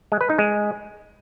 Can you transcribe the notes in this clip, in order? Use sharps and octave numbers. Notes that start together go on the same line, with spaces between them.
G#3
B4
D#4
G#3